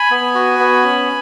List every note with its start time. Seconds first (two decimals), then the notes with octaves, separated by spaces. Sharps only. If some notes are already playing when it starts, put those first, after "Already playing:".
Already playing: G#5 B5
0.11 B3
0.35 F#4
0.59 B3
0.84 C#4